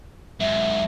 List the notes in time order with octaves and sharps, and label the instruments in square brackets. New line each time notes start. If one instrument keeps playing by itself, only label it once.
[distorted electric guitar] G#2 F#3 [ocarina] E5